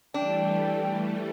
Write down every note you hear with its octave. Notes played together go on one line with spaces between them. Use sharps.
E3 G3 A3 D4 G5